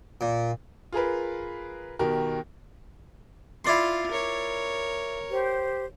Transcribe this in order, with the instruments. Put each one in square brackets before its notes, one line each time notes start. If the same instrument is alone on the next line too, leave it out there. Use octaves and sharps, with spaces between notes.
[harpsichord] A#2
[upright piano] F4 G#4 A#4 B4
B2 D#3 G4 A#4
[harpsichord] E4 D5 C6 [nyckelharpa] F4
[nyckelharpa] A#4 C#5
[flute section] G4 C5